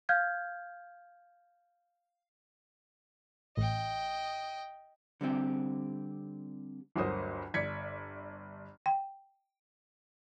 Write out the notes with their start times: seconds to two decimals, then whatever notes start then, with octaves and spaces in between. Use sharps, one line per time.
0.09 F5 F6 G6 G#6
3.57 A1 D#5 G5
5.21 D3 G3 C4 G4
6.96 G1 D2 F#3 A#4 C5 D#6
7.54 G1 D5 G#6 B6 C#7
8.86 G5